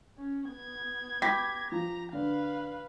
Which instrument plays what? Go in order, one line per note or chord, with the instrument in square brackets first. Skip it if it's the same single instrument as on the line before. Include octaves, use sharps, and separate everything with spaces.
[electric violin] C#4
B3 G#6
[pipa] G4 [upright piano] B5 A#6 B6
[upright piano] F3 [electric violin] A#5
[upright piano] D3 [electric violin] B4 F5